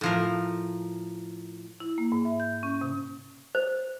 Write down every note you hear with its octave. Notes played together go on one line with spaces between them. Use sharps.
A2 F3 A#4
E4
A#3
G#2
E5
G6
C#4
C3
C5